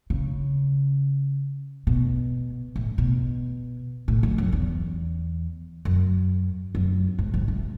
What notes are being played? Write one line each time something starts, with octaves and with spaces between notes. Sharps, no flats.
C#3
B2
A2
B2
A2
F#2
F#2
E2
F#2
F#2
G#2
G#2
F#2